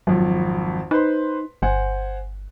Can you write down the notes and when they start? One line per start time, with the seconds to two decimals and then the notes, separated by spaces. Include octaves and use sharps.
0.07 G#1 F2 F#3
0.91 D#4 B4 C5 C6
1.62 G1 C5 F#5 G#5